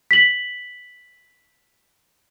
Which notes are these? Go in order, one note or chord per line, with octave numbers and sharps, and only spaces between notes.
B6 F#7